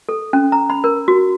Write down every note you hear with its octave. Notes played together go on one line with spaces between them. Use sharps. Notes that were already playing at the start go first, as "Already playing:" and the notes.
A4
C#4
A#5
B5
A#4
F#4